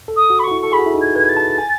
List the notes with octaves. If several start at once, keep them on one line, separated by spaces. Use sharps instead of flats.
A4
D#6
F#4
B5
F#4 C#6
E4
A4 C#6
G#4 B5
F#4
E4
D#4
G#6
B4 G#6
A6
A5
G#5